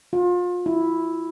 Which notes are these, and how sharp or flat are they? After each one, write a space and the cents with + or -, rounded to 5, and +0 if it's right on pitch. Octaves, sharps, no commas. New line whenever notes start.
F4 +30
E4 -5